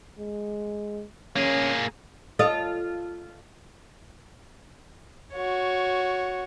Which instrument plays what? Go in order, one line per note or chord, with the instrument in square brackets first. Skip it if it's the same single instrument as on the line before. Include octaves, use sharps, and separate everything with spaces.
[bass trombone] G#3
[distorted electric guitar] A#3 G#4 [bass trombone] C#4
[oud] F4 A4 D#5
[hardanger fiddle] F#4 C#5